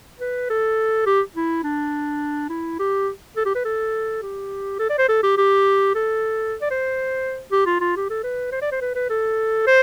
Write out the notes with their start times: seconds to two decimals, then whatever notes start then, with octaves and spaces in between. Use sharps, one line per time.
0.20 B4
0.50 A4
1.06 G4
1.36 E4
1.64 D4
2.50 E4
2.79 G4
3.36 A4
3.45 G4
3.55 B4
3.65 A4
4.22 G4
4.79 A4
4.90 D5
4.98 C5
5.08 A4
5.23 G4
5.38 G4
5.95 A4
6.62 D5
6.71 C5
7.52 G4
7.66 F4
7.80 F4
7.96 G4
8.10 A4
8.23 B4
8.52 C5
8.62 D5
8.72 C5
8.81 B4
8.95 B4
9.10 A4
9.67 C5